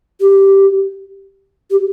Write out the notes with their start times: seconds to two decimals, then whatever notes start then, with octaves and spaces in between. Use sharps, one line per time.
0.20 G4
1.70 G4